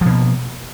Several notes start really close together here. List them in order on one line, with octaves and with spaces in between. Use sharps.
F3 B2 A#3